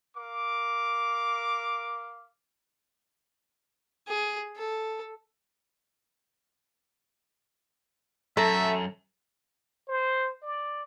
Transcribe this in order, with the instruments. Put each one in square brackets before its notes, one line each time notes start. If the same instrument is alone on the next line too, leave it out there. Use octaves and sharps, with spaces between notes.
[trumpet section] A#4 F5 D6
[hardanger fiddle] G#4
A4
[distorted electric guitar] F#2 [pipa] A3 [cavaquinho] A4 A#5 [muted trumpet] E5
[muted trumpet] C5
D5